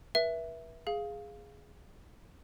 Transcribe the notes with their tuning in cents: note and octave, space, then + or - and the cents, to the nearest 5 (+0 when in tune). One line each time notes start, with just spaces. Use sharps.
B4 -35 E5 +0
G#4 +0 F5 +0